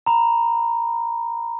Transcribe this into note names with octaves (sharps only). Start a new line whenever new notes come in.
A#5 B5